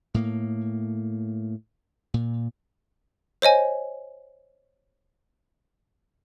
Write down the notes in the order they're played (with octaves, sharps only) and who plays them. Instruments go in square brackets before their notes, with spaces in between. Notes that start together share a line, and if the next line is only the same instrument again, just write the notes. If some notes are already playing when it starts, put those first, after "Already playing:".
[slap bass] A2 A#3
A#2
[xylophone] C5 C#5 D#5 G#5